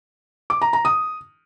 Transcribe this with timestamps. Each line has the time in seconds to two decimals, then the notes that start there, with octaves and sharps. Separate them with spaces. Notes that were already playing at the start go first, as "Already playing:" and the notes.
0.50 D6
0.62 A#5
0.73 A#5
0.85 D#6